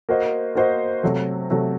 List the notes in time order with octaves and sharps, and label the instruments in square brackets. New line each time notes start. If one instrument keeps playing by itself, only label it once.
[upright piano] A#3 F#4 C5 D#5
A#3 F#4 C5 D#5
C3 F#3 A3
C3 F#3 A3